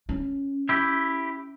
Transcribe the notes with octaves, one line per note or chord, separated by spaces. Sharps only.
C#4
E4 G4